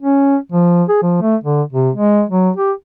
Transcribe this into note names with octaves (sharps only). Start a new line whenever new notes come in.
C#4
F3
G#4
F3
A3
D3
C3
G#3
F#3
G4